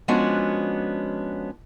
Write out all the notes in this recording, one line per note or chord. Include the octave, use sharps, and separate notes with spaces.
F3 G#3 B3 C#4 D4 F#4